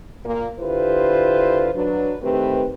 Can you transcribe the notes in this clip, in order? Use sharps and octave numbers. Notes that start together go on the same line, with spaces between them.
A#2 A#3
D3 E4 F4 G4 B4 C5
F#3 D4 B4
D#3 A3 C4 G4 B4